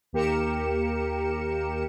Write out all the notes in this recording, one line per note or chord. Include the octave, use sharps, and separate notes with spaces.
D#2 A#3 G4 A#4 C#7 E7